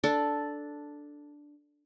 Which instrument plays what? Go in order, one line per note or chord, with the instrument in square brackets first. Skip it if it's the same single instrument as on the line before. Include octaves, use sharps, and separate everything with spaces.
[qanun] D4 A4